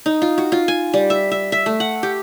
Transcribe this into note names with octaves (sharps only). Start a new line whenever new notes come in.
D#4
F4
F#4
F4
G#5
G3
E5
E5
E5
A3
F#5
G4